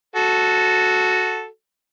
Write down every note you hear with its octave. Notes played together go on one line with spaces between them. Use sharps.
F#4 A4